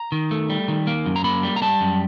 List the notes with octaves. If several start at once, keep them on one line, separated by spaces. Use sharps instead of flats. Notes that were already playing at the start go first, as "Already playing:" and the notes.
Already playing: A#5
D#3
A3
G3
D#3
A#3
F#2
A#5
A#3 B5
G3
A#5
G3 A5
F#2